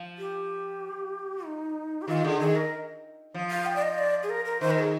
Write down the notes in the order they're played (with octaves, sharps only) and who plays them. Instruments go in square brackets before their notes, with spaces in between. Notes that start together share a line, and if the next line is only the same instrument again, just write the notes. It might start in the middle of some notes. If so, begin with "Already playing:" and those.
Already playing: [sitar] F3
[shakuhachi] G4
D#4
G4
[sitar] D#3 [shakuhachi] F4
[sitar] D3 [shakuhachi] G#4
[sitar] D#3 [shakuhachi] G#4
[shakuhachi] A#4
[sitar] F3
[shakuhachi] F5
G5
D5
D#5
D5
G#4
A#4
A#4
[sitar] D#3 [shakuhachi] C5
[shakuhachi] A#4
G#4